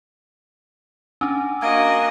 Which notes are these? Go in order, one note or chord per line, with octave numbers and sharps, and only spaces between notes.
C#4 D4 G#5 D6
A#3 F#4 D#5 G#6 D7 D#7